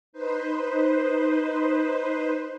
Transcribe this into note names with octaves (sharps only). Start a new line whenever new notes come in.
D#4 B4 C5